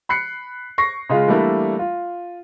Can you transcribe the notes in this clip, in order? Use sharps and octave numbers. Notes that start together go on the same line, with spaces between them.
B5 F#6 C7 C#7
C#6 A#6 C7
C#3 G#3 F4
E3 G3 A3 A#3 D4 E4
F4